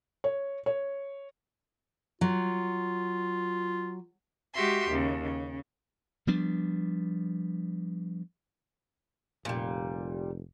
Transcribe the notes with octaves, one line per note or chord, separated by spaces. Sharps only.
C#5
C#5
F#3 F4
G#3 F#4 G4 E5 C6
D#2 C#3
C#3
F3 G3 B3 D4
F1 A#2 G3